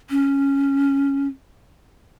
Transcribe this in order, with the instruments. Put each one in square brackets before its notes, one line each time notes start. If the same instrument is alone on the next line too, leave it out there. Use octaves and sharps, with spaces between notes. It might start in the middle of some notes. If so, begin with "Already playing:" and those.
[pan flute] C#4